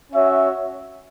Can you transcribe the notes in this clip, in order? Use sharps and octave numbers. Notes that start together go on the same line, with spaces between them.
C#4 F#4 C#5 E5